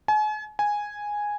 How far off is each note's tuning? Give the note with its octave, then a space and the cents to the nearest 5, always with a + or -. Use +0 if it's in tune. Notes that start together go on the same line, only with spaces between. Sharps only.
G#5 +40
G#5 -5